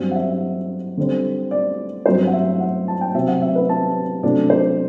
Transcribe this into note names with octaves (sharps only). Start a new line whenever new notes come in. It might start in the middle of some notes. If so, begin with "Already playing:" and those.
Already playing: G2 F#3 C4
F#5
E5
D3 G3 C4
D5
G2 F#3 C4 C5
F#5
E5
F#5
A5
G5
C3 F#3 C4 E5
F#5
E5
B4
A5
C3 F#3 A3 D4 D5
C5